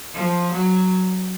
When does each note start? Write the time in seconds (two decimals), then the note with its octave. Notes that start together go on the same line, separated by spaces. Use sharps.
0.14 F3
0.52 F#3